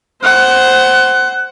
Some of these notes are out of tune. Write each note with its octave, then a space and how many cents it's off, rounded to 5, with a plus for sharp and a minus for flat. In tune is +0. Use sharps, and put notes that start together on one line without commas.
C5 +0 F#5 +20